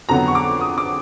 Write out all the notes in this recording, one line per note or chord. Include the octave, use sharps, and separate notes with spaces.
F2 D3 F#3 B3 A#5
C#6
D6
D#6
D6